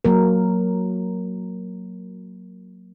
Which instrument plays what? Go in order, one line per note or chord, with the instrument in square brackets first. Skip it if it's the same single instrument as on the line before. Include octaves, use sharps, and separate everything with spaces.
[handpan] F#3 A#3 A#4